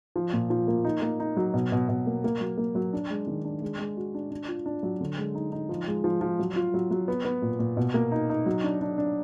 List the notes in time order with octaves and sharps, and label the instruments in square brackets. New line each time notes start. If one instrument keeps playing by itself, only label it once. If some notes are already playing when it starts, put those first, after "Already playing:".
[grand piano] F3
A#2
F3
A#3
D#4
A#3
D#4
F#3
B2
B2
B2
A#3
A#3
F#3
A#3
F#3
D4
G#3
D#3
D4
G#3
G#3
F#4
D4
D4
F4
D4
F#3
D3
G#3
D#4
D#4
F3
G#3
F3
F3
F#3
F4
F#3
F#3
B3
B3
A#2
A#2
B2
A#3
D#4
D#4
F#3
D4
D4
D4